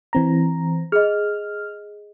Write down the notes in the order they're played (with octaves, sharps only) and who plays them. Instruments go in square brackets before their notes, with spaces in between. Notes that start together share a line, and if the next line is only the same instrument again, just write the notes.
[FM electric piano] E3 C4 A#5
[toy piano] G#4 D#5 [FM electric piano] F6